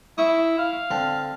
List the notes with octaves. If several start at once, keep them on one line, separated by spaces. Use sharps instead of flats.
E4 E5 C#6 D#6
F5
D3 C4 A4